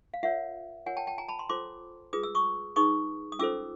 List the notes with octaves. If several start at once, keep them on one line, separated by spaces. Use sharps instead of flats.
F5
F4 A#4 C#5 E5 F#5
F4 A#4 C#5 F#5 G#5
G5 A5
G5 A5
G#5 A#5
A5 B5
A#5 C6
F4 A4 C5 C6 D6
F4 G#4 B4 D#6
E6
C#6 D#6
D#4 G#4 B4 C#6 D#6
D#6
C#4 F4 A4 C5 D6 E6